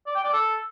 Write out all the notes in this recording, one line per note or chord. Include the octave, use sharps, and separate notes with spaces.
D5
G5
D5
A4